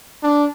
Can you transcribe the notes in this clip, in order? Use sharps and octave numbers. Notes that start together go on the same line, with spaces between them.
D4